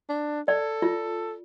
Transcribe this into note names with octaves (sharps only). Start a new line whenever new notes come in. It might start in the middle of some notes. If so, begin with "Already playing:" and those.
D4
A4 D5
F4